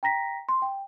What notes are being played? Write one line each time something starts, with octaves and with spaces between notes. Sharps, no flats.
G5 A#5 A#6 B6
C6
G5